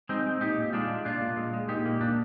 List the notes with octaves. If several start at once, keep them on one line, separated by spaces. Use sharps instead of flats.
G#3 C4 D#4
G#3
A#2 D#4 G4
A#2
G#3 D4 F4
G#3
A#2 D4 F4
A#2
G#3
G#3
A#2 D#4 G4
A#3
A#2 D4